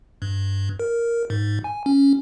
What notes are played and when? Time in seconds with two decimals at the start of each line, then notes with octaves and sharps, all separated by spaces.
0.22 G2
0.80 A#4
1.30 G#2
1.64 G#5
1.86 C#4